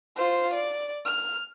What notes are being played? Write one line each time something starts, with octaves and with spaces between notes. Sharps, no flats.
F4 C5
D5
F6